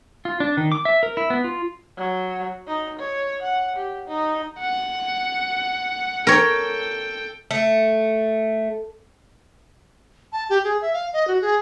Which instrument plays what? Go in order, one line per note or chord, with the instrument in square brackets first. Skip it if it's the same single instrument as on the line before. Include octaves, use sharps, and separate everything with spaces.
[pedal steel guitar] F4
D4
D#3
D6
E5
A#4
E4
B3
F4
[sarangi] F#3
D#4
C#5
F#5
G4
D#4
[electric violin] F#5
[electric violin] A4 G5 [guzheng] A#4 C#5
[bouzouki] A3
[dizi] A5
G4
G#4
E5
F5
D#5
F#4
G#4